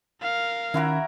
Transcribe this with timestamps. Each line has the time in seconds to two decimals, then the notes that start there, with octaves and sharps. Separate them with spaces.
0.22 A#4 F5
0.74 D#3 C#4 E4 F#4 A#4